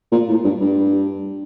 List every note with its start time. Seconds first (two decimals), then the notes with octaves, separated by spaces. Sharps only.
0.12 A#2
0.28 A2
0.44 G2
0.60 G2